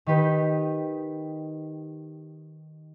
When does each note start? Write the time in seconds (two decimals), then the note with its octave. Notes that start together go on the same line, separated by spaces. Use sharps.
0.06 D#3 D#4 G4 B4